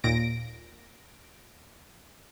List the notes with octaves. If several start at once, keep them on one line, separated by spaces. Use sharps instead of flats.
D#2 A#2 A#6 D7